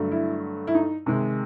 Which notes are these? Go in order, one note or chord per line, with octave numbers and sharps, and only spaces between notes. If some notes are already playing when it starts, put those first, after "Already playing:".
Already playing: G2 D3 F#3 A3
E4
E4
D#4
C3 D#3 G#3